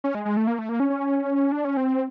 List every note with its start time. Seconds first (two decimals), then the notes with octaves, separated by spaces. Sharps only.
0.04 C#4
0.15 G#3
0.25 G#3
0.37 A3
0.47 A#3
0.59 A3
0.69 A#3
0.80 C#4
0.90 C#4
1.52 D4
1.65 C#4
1.77 C4